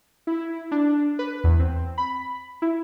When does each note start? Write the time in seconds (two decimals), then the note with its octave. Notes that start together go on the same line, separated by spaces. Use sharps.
0.27 E4
0.72 D4
1.19 B4
1.44 E2
1.60 C4
1.98 B5
2.62 E4